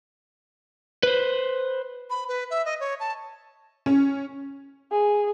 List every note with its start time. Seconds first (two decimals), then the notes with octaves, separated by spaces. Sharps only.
1.03 B4 C5
2.10 B5
2.28 B4
2.50 E5
2.65 D#5
2.80 C#5
3.00 A5
3.86 C#4
4.92 G#4